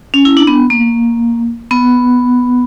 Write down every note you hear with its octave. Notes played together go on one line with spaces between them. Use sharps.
C#4
E4
D4
B3
A#3
B3